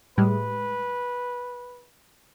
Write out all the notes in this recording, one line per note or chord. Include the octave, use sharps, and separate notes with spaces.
A2 G3 G#3 B4